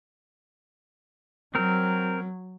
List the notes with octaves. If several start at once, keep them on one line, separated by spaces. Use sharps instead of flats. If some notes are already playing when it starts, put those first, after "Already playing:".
F#3 C4 A#4